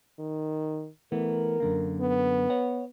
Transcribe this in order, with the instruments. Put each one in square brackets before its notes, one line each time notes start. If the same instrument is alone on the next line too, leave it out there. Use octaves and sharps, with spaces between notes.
[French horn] D#3
[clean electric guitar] E3 A3 B3 [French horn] A#4
[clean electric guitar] F#2 D3 A#3
[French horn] B3
[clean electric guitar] C#5 F#5